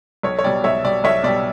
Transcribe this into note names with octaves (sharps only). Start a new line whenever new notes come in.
B1 C#5
C#5
B2 G3 D5
B1 C#5 E5
B2 G3 D5
B1 C#5 E5
B2 G3 D5